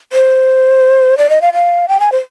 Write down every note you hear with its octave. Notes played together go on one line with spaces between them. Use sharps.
C5
D5
D#5
F5
F5
G5
G#5
C5